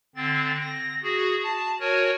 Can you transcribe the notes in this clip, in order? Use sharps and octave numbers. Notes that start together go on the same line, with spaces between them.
D3 C4 A6
A#6
F#4 G#4
A5
F#4 A#4 C#5 G#5